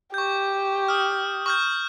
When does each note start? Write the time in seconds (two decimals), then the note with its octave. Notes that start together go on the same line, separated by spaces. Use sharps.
0.14 G4 C#6 G6
0.88 D#6 F6
1.46 C#6 F6 G6